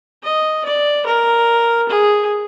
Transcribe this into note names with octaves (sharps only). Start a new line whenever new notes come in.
D#5
D5
A#4
G#4